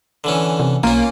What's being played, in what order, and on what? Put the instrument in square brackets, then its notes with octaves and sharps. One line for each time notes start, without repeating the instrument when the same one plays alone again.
[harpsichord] D3 E3 C#4
[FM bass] C3
[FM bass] B1 [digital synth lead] A#3 [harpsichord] C#4 F4